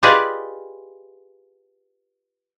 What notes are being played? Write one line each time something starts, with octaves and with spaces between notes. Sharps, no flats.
F4 G4 G#4 B4 D5 D#5